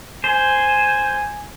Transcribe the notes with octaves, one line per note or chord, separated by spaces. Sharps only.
C5 G#5